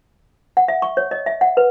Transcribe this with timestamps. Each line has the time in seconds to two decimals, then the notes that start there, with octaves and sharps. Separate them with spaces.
0.57 F#5
0.68 E5
0.82 C#6
0.97 C#5
1.11 D#5
1.26 E5
1.41 F#5
1.57 B4